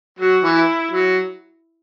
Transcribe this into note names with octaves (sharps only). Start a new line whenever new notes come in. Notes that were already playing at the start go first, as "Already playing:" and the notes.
F#3 F#4
E3
E4
F#3